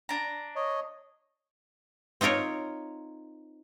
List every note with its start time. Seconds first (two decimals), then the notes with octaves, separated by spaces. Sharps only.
0.09 D4 A#5
0.56 C#5 D#5
2.21 C4 D#4 F4 A#4 C#5